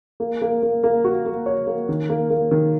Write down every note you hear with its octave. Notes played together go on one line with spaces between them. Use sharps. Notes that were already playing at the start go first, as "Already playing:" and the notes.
A#3
A#3
A#3
A#3
F#4
A#3
C#5
A#3
D#3
A#3
A#3
D#3